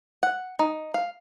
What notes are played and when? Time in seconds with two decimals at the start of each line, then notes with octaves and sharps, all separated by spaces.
0.23 F#5
0.59 D#4
0.94 F5